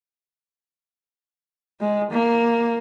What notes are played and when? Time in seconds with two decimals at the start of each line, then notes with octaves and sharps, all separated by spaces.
1.81 G#3
2.11 A#3